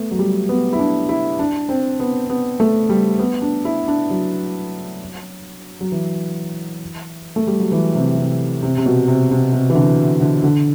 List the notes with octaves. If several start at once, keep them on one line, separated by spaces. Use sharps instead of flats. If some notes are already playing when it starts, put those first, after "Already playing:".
Already playing: A3 B3
F#3
G3
B3
E4
D4
E4
D4
C4
B3
B3
A3
G3
B3
D4
E4
D4
F#3
F#3
E3
A3
G3
F#3
E3
C3
C3
C3
C3
B2
C3
C3
C3
E3
D3
D3
D3